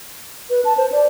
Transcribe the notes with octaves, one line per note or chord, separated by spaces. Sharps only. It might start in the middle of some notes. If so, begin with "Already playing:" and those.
B4
A5
C5
D5